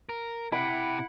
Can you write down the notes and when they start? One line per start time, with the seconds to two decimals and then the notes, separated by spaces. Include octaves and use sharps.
0.09 A#4
0.52 C3 E4 F#5 G5 B5